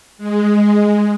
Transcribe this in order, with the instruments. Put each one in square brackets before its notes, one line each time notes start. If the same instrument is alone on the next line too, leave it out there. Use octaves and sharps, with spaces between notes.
[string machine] G#3